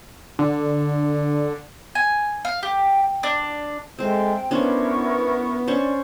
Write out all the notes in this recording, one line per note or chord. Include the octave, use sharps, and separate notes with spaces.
D3
G#5
F5
G4
D4
G#3 A3 C4 C5 G5
B3 C#4 D4 E4 A#4 C5 C#6
C#4 D4 C5 D5 C#6